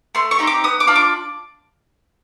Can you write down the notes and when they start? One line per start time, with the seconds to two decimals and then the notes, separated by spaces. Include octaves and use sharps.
0.15 A3 C6
0.31 C#6
0.39 C4 D#4 G4
0.47 D6
0.64 B3 D#6
0.80 D6
0.87 D4 F4
0.96 D6